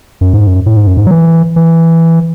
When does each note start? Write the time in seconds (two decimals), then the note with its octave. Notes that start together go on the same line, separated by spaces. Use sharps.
0.21 F#2
0.34 G#2
0.47 F#2
0.66 A2
0.77 G#2
0.87 F#2
0.97 G#2
1.07 F#3
1.11 E3
1.56 E3